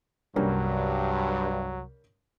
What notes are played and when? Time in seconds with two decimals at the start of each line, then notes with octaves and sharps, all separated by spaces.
0.36 C2 G2 F#3 G3 A#3 C#4